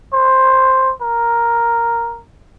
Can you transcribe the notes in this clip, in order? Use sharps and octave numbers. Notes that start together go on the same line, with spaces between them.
C5
A#4